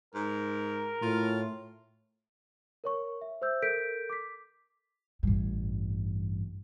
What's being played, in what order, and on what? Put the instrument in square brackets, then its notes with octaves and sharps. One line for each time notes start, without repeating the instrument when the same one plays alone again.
[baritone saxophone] G#2 [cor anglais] A#4
[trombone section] A2 [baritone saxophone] F4
[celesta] A#4 C#5 C#6
E5
C5 E5 E6 G6
A4 A#4 G6 B6 D7
D6 B6
[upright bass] A1 G2